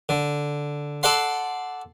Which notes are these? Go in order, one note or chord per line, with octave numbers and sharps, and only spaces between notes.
D3
A4 D5 F#5 C6